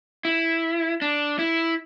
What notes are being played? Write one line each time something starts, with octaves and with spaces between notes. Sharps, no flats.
E4
D4
E4